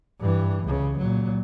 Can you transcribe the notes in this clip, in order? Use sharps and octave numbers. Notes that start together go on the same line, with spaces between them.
G2 E3
C#2 C#3
A#2 F#3